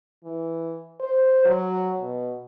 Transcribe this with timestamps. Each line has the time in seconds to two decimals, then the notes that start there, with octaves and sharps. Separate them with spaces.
0.24 E3
1.00 C5
1.45 F#3
2.00 B2